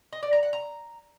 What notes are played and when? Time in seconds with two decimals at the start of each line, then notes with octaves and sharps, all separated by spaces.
0.13 D#5
0.23 D5
0.33 A#5
0.43 F#5
0.53 A#5